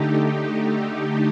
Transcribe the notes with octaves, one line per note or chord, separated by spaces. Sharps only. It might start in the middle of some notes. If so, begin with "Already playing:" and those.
Already playing: D3 A3 D#4 G4